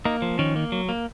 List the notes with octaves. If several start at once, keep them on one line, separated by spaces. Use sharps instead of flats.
A#3 D#4
F3
D#3 C#4
A#3
F#3
A#3